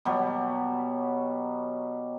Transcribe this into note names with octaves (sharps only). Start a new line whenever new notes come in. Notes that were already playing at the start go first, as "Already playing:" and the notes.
B2 F#3 G3